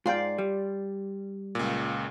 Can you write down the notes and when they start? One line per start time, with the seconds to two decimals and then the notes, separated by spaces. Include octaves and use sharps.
0.06 G#2 F4 D5 G5 C6
0.38 G3
1.55 C#2 A#2